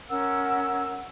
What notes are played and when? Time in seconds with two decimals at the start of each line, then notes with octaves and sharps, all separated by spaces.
0.09 C#4 A#4 F#5 E6